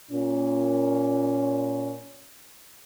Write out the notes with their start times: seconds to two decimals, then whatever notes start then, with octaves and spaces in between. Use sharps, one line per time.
0.11 A#2 C#4